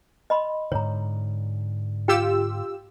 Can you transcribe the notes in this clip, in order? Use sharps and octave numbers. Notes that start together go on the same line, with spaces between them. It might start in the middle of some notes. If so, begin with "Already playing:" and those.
D#5 B5 C6
G#2 D3 C#5 A#5
F4 G4 G5 E6